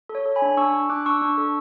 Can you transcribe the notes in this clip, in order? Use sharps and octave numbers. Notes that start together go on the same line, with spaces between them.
A4
C#5
A4
G#5 B5
D4
D4 C#6 E6
D4
D4 D6 F#6
D4 C#6 E6
D4
A4